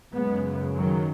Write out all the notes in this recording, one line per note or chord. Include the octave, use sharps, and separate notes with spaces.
F#2 C#3 G#3 B3
D#3 F#3